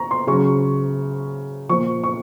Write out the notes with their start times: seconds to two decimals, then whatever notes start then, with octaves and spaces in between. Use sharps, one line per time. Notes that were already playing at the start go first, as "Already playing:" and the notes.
Already playing: A#5 C#6
0.11 C6
0.27 C#3 F#3 C#6
1.69 A#2 F3 C#6
2.04 C#6